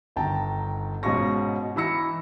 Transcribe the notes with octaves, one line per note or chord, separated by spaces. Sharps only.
G1 D#3 G5 A5 A#5
G#2 B2 C#4 F4 C#6 A#6
E3 D#4 B5 E6 A#6 C#7